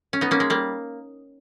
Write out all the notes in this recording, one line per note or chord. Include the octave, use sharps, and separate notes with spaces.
C#4
B3 D#4
A#3 C#4
G#3
G3 A#3